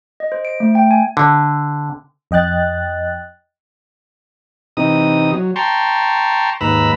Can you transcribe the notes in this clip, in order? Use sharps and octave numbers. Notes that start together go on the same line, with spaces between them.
D#5
C5
D7
A3
G5
G#5
D3
F2 D#5 G5 F#6 A6
C3 E3 D#4 D#6
F#3
G5 A5 A#5 C6 C#6
D#2 G#2 B4 A#5 B5 E6